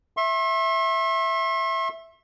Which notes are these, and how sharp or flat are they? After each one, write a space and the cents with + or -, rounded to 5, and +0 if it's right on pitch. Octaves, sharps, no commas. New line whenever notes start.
E5 +0 C6 +45